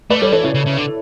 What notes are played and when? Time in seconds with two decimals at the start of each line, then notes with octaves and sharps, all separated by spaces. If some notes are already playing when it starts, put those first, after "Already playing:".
0.10 A3 B4 D5
0.21 G3 A4 C#5
0.32 E3 A4 C#5
0.44 C#3 E4
0.54 C#3
0.66 C#3
0.77 D3